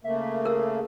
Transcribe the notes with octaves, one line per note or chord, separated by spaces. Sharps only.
C#3 A3 A#3 E5
G#4 A#4 E6